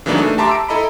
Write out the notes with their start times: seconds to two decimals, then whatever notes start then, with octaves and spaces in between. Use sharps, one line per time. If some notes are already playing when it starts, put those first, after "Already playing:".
0.06 C#3 E3 F#3 A#3 D4 D#4
0.18 A3
0.38 G4 E5 A5 A#5 C6 D6
0.49 E6 D7
0.68 E4 A4 D#5 A#5 B5